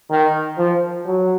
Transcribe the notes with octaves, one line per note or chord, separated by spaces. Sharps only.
D#3
F3
F#3